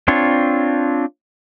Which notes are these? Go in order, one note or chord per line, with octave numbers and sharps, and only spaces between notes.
C4 D4 F4 C#5